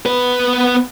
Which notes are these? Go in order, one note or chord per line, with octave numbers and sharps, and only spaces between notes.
B3 B4